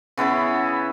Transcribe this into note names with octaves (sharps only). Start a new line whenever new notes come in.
C#3 B3 E4 B5